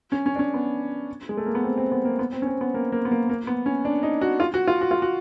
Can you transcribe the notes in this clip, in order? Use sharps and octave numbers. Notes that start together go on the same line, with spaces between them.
C#4
C#4
D4
C#4
B3
G#3
A3
A#3
B3
C4
C4
B3
A#3
B3
C4
C#4
C4
B3
A#3
A#3
B3
A#3
A#3
B3
C#4
D4
D#4
F#4
F4
F#4
F4
F#4
F4
F#4